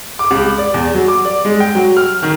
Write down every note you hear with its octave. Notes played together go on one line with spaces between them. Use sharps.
D6
C#2
D5
E2
F#3
D6
D5
G#3
G5
F#3
F6
D#3